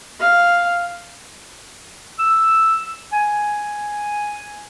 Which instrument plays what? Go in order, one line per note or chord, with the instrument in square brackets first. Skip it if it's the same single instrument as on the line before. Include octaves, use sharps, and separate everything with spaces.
[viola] F5
[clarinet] E6
G#5